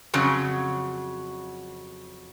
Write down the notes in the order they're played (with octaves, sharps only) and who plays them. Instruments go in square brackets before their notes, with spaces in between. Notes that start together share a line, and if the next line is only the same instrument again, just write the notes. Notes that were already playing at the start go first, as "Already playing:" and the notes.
[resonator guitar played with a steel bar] F2 C#3 F#3